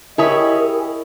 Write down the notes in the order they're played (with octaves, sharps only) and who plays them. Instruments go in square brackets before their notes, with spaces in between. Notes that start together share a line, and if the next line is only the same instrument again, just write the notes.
[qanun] E4 C#5 B5 [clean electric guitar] G4 G#4 [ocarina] A#4 [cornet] D#5